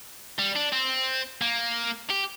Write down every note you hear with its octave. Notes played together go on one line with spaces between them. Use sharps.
G3
D4
C4
A#3
G4